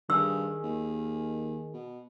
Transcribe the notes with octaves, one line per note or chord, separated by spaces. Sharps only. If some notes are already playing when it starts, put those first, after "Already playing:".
G2 D#3 G#4 E6
D#2
B2